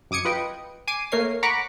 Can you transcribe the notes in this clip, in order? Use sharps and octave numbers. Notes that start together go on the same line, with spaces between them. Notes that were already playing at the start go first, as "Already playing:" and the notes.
F#2 D6 D#6 G#6 C#7
F4 B4 D#5 G5
G#5 D6 C7 D#7
A3 A#3 A#4 C#5 C7
F#5 A#5 B5 C#6 D6 F#6